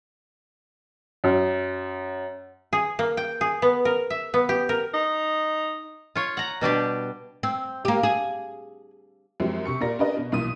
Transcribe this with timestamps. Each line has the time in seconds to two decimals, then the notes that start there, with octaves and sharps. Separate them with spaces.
1.24 F#2
2.73 G#4
2.99 A#3
3.17 G5
3.41 G#4
3.62 B3
3.85 A#4
4.10 E5
4.34 B3
4.49 G4
4.69 A#4
4.94 D#4
6.15 F4 C#5
6.37 F#5 A#5
6.61 B2 G3 D4 G4
7.43 C4
7.85 A#3 G4
8.03 G#4
9.40 F#2 F3 G#3 C4 G4
9.65 C3 C#6 C#7
9.81 A#2 F4 G4 A#4 D5 A#6
9.99 C#4 D4 G4 A#4 B4 D#5
10.16 B2
10.32 B1 A#2 E3 D#6 D#7